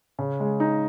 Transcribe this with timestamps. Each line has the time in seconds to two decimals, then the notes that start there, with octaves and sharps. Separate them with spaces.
0.19 C#3
0.40 G#3
0.60 D#4